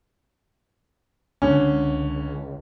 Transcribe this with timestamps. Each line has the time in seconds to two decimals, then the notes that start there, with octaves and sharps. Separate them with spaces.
1.42 C#2 D3 C#4